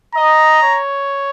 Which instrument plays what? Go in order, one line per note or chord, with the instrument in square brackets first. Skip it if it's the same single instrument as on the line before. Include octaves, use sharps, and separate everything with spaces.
[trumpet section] D#5 [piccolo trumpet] A#5
[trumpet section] C#5